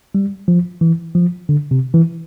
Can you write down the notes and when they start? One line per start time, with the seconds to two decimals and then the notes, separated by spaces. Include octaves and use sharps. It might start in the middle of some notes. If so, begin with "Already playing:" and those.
0.15 G3
0.48 F3
0.81 E3
1.15 F3
1.49 D3
1.71 C3
1.94 E3